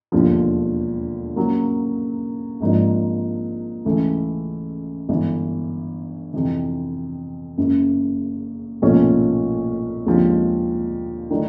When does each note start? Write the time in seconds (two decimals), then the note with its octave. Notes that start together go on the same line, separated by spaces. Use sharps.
0.12 E1 D#2 D3 F3
1.36 C#3 F#3 A#3
2.61 G#1 G#2 F3 A#3 D4
3.85 C#2 C#3 E3 A3
5.09 G1 G2 E3
6.34 F2 C3 E3
7.57 F#1 F#2 C#3
8.82 B1 A#2 F3 A3 C#4
10.06 D#2 D3 F3 G#3 C4
11.31 D#3 F#3 A3 D4